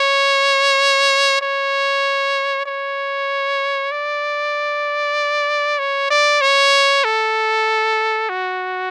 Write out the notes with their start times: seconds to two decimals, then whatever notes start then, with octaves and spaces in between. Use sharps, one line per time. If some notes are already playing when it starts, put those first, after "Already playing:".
Already playing: C#5
1.42 C#5
2.66 C#5
3.92 D5
5.79 C#5
6.10 D5
6.41 C#5
7.04 A4
8.29 F#4